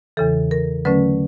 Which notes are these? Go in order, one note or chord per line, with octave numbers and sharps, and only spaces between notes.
E2 C#3 E3 A4
A#4
D3 F#3 A3 C#4 B4